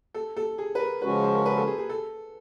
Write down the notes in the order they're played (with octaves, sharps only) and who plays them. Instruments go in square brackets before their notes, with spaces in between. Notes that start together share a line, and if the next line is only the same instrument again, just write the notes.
[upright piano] A4
A4
G#4
B4
A#4
[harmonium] C#3 F3 G#3 C#4 F#4 [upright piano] B4
[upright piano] C5
A#4
B4
A4
G#4
G#4
A4